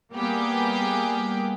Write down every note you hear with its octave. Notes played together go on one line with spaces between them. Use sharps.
G3 A#3 B3 G4 G#4